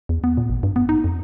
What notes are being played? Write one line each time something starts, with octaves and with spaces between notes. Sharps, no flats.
E2
B3
A#2
G#1
G2
B3
D#4
F2